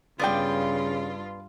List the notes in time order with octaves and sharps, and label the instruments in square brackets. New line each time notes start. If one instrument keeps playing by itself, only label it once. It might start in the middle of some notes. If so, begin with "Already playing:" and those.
[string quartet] G2 F4 [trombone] C#3 [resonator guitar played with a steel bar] B3 D5 G5